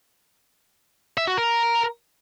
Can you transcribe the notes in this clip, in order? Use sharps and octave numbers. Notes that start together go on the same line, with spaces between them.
E5
F#4
A#4